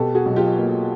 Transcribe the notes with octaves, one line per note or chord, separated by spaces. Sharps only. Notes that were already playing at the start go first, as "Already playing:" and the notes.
Already playing: B2 G4 A4
F#4 G#4
B1
F4 G4
A#3